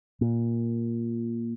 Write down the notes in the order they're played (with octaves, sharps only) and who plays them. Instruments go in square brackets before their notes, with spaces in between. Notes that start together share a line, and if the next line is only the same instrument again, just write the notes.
[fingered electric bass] A#2